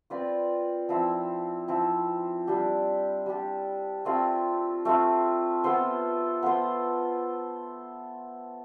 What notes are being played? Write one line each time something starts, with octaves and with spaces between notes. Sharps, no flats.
C4 F4 B4 D5
F3 C4 E4
F3 C4 E4
G3 D4 G4
G3 D4 G4
A3 C4 F4
A3 C4 F4
B3 F4 A4 C5
B3 F4 A4 C5